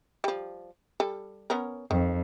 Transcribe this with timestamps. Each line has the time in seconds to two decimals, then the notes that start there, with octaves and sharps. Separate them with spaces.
0.24 F3 G3
1.00 G3 A4
1.50 B3 C#4 A#4
1.91 F2 D#3